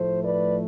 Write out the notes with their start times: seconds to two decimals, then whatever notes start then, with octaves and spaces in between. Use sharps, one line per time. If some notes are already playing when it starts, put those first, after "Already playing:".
Already playing: A2 F3 A3 C5
0.24 B4 D5